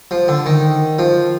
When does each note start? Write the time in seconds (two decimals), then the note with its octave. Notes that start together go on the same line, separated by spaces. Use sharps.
0.11 F3
0.28 D3
0.46 D#3
0.99 F3